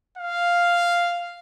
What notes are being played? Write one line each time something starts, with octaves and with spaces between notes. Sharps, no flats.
F5